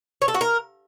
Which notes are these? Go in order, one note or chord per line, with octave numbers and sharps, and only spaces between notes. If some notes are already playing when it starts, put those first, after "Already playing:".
C#5
A4
F#4
A#4